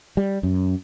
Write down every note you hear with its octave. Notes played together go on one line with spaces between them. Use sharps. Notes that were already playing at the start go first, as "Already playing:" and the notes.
G3
F#2